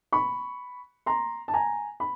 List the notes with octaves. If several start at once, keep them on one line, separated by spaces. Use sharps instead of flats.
B5 C#6
A#5 C6
A5
G#5 A#5
B5